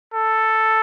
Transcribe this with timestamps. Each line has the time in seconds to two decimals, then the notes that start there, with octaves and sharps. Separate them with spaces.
0.14 A4